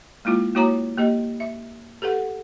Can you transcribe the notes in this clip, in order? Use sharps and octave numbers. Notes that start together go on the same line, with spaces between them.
G#3 A#3 E4 F4
A#3 E4 F#4 C#5 A#5 D6
A#3 G4 D#5
E5
G4 A4 B4 F#5